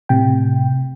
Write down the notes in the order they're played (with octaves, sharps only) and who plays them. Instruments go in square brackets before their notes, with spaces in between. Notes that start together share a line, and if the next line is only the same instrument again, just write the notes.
[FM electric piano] A2 C3 G5